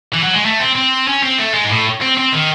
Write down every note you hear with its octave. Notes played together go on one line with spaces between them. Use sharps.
E3
F#3
G#3
A3
C4
C4
C#4
C4
A3
G#3
G#2
A2
C4
C4
D#3